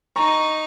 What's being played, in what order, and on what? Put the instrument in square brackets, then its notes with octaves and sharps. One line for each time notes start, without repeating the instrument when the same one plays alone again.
[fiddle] D#4 [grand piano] A#5 C#6